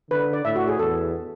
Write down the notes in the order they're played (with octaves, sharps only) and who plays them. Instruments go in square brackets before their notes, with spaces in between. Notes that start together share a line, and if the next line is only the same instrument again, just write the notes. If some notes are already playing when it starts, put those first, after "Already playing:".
[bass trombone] D3 [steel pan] B4
[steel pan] D5
[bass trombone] A2 [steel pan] E5
[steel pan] F#4
G#4
[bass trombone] E2 [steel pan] A4